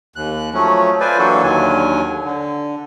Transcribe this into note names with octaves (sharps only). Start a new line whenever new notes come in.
D#2 F#6
F3 F#3 A3 C#4
F4 B4 C5 D5 G#5
E3 F#3 A#3 D4 F#4 A4
D#2 D3 D#3 F#3 G#5
D3